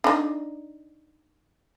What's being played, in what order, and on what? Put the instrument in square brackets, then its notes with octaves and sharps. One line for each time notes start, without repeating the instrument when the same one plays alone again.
[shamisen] D4 D#4